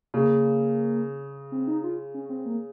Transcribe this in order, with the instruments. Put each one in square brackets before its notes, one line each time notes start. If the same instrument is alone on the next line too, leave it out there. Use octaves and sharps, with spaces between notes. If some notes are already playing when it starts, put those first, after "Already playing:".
[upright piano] C#3 [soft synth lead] A#3
[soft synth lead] C4
D#4
F4
C#4
C4
A#3